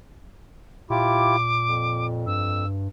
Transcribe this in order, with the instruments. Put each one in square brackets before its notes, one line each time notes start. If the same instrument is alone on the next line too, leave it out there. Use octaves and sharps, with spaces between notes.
[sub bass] A#2 [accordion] E4 F4 G4 [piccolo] D6
[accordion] F2
[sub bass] G2 [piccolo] E6